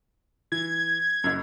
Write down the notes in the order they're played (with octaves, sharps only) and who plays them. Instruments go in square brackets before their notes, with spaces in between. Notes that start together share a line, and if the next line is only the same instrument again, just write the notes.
[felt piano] E3 [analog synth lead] G#6
[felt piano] F#1 F#2